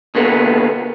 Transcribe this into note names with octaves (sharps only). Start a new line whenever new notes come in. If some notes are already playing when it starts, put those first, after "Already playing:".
B2 D3 A#3 B3